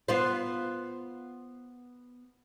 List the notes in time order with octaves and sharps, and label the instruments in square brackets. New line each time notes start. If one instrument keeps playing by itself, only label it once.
[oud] B3 F4 C5